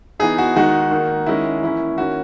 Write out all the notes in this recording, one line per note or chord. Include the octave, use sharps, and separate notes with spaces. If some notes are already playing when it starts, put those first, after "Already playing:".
E3 B3 D#4 G#4
F#4
D#3 G#3 D#4 F#4
D#3 A#3 D#4
D#3 G#3 C#4 E4
E3 A#3 C#4 E4
D#3 A#3 C#4 F#4